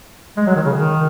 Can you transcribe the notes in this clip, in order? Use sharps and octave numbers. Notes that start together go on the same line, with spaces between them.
G#3
F#3
D#3
C#3
D#3